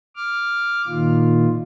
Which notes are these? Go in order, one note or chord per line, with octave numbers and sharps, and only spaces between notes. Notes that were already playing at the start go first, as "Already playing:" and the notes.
D6 F6
A#2 D#3 F4